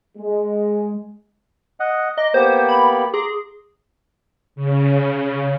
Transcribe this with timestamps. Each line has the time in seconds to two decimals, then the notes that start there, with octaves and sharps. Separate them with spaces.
0.18 G#3
1.80 D#5 F#5
2.18 D#5 A#5 D6
2.34 A#3 B3 G4 C5
2.69 B5
3.14 G#4 A#5 C6 D6
4.56 C#3